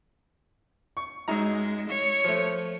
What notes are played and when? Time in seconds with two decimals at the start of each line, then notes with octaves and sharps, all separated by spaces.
0.97 C#6
1.28 F#2 G#3 D#4 A#5
1.88 C#5
2.24 F3 A3